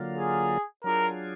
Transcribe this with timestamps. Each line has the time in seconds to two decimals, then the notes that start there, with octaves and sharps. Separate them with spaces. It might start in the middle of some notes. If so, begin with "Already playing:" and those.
Already playing: D3 F#3 A#3 F4
0.18 G#4
0.84 F#3 D4 F4 G#4 A#4